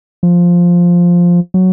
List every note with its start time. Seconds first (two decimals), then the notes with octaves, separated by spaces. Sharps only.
0.23 F3
1.54 F#3